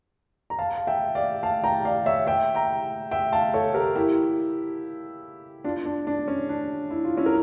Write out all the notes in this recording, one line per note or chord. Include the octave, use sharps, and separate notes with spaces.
A#5
F5 A5
F5
E5 G5
D5 F5
F5 A5
G5 A#5
D5 F5
C#5 E5
E5 G5
G5 A#5
E5 G5
F5 A5
A4 C#5
G4 A#4
E4 G4
D4 F4
D4
D4
C#4
D4
E4
F4
C#4 E4
A#4